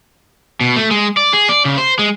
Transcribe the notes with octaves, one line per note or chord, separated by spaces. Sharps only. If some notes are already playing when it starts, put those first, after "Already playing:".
B2
A3
G#3
D5
G#4
D5
C#3
C5
G#3